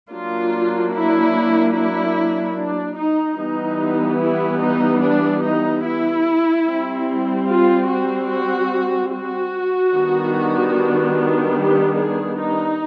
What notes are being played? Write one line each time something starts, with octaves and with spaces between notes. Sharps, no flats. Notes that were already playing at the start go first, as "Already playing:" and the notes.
F#3 A#3 D4 F4
E4
E4
D4
D#4
E3 G3 B3 D#4
E4
D#4
D4
D#4
E4
G3 C4
F4
F#4
F#4
F#4
D#3 G3 B3 D4
G4
G#4
D#4